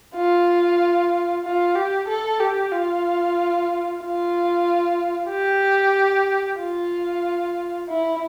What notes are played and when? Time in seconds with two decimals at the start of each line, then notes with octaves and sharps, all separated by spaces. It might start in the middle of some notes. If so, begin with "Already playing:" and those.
0.15 F4
1.44 F4
1.75 G4
2.08 A4
2.40 G4
2.72 F4
4.01 F4
5.30 G4
6.59 F4
7.89 E4